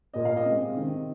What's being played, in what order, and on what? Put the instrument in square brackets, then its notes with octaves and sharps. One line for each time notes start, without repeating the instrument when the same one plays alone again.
[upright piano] A#2 A#3 D#5
F5
D#5
C3 G#3 C4
C3 D#3 C4